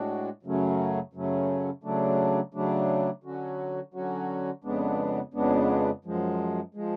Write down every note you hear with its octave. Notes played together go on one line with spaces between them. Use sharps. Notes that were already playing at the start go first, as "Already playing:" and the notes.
Already playing: A2 G#3 D4 F#4
F#2 C#3 F#3 A3 C#4
F#2 C#3 F#3 A3 C#4
C#3 F#3 A3 D4
C#3 F#3 A3 D4
D3 F#3 C#4 F#4
D3 F#3 C#4 F#4
F2 C#3 G#3 B3 D4
F2 C#3 G#3 B3 D4
F#2 F3 G#3
F3 G#3